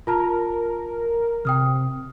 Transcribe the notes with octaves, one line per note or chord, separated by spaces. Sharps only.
F4 A#4 A5 A#5
C3 G5 D#6 F6